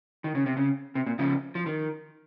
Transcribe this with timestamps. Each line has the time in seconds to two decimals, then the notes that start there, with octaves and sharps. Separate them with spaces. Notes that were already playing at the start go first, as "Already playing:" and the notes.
0.24 D#3
0.35 C#3
0.46 C3
0.57 C#3
0.95 C3
1.07 A#2
1.19 C#3 F3
1.55 F3
1.66 D#3